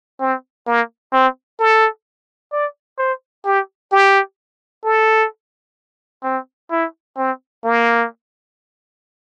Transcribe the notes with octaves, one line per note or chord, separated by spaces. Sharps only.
C4
A#3
C4
A4
D5
C5
G4
G4
A4
C4
E4
C4
A#3